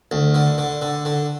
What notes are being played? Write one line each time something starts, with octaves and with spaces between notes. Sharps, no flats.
D2
D3
D3
D3
D3